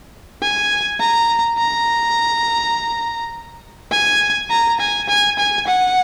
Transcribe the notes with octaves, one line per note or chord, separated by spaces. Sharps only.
G#5
A#5
A#5
G#5
A#5
G#5
G#5
G#5
F#5